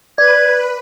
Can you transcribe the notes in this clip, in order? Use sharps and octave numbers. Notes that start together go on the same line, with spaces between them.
B4 D5 G#6